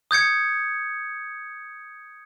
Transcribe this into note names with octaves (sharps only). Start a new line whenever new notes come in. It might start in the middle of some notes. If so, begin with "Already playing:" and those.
D#6 G6 G#6 C#7